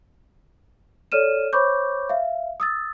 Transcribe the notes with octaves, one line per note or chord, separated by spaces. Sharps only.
A4 C#5 D5 F6 D#7 E7
C5 C#5 B5 C#6 D6 G6
E5 F5
D#6 E6 A6